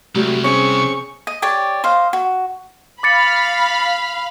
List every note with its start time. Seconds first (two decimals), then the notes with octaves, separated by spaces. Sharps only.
0.15 C2 F#3 G3 A3
0.44 C4 C#4 G#4 C#6
1.27 D#5
1.42 G4 C#5 D5
1.84 C5 D#5 F5
2.13 F#4
3.03 F5 B5 D6 A6 C#7